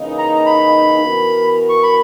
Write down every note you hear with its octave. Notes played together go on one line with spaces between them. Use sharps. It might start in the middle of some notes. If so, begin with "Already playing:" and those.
Already playing: C#3 E3 A#3 D#4
A#5
A#5
B5
E3 B3 F#4 A#4
C#6
B5